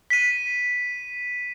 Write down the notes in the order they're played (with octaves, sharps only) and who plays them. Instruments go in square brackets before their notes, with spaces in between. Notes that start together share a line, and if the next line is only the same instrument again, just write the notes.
[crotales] B6 D#7